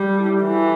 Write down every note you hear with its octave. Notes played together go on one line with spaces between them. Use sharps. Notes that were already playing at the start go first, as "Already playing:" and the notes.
Already playing: G3
A4
E4 G4
E3 F#4